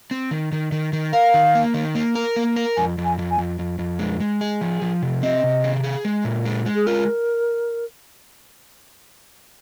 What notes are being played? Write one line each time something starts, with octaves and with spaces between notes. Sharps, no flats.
C4
D#3
D#3
D#3
D#3
A#4 F5
D#3
A#3
D#3
A#3
A#4
A#3
A#4
F2 G#5
F2
G#5
F2
G#5
F2
F2
F2
G#3
G#3
G#4
F3
F3
C3
C4 D#5
C3
G#4
G#4
G#3
A#2
G#3
G#3
G#4
F4 A#4